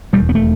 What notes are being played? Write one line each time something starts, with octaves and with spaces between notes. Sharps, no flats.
E1 D#2 G3
B3
A3